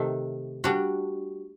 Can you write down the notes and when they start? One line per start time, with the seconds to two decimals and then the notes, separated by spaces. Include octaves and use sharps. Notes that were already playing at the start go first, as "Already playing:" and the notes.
Already playing: C3 D#3 A3
0.64 G3 D4 F#4